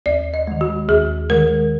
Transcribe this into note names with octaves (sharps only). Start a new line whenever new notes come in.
D#2 D5
D#5
D#3 G#3
F#4
D#2 G#4
D#3 G#3 A#4